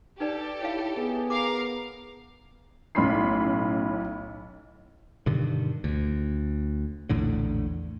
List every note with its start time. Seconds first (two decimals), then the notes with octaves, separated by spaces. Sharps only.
0.20 D#4 G4 A4 B4 D5
0.62 E4 C#5 F5
0.97 B3 G#4
1.30 A#4 F5 A#5 D6
2.95 B1 A2 C#4 B5 C6 C7
5.26 G2 B2 D3 D#3
5.84 D2
7.09 A#1 E2 A2 D3